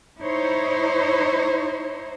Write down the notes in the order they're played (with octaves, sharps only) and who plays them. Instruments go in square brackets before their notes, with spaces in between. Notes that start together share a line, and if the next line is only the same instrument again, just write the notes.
[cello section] D#4 E4 C5 C#5